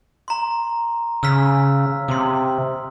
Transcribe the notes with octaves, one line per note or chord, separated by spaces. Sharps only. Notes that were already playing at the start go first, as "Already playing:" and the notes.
A#5 C6
C#3 E6 F6 B6
C3 C6 D#6